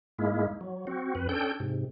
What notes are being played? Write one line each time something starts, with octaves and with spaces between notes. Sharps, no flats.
G#2 G#3 A#3 E4
F#3
C4 F#4
F2 B4
C#4 D4 A4 G5 G6
G#2 C3